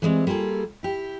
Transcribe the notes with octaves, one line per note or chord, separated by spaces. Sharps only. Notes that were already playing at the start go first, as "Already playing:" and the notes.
E3 G3 G#3 C4
G3 A#3 F4 G#4 A4
E4 G4